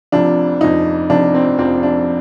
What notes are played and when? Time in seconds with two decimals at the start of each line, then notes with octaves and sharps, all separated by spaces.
0.12 F1 F2 C3 F3 D4
0.61 F1 F2 C3 F3 D#4
1.10 F1 F2 C3 F3 D4
1.34 C4
1.59 F1 F2 C3 F3 C4
1.83 D4